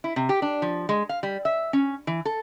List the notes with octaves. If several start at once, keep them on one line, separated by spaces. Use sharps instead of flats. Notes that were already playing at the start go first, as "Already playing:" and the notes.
E4
C3
G4
D4
F3
G#3
F5
G3
E5
C#4
E3
A4